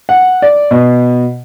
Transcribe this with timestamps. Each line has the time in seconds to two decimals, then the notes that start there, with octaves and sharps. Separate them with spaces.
0.09 F#5
0.42 D5
0.71 B2